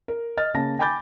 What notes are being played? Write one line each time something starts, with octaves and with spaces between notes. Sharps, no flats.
A#4
D#5 F6 A6
C#3 A#3 A5 A#6
G5 G#5 B5 D6 G6 A6